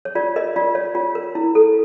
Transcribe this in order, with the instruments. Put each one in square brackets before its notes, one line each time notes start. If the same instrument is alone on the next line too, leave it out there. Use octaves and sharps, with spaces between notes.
[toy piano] C#5
F4 D5
A#4 D#5
F4 D5
C#5
F4
A#4
E4
A4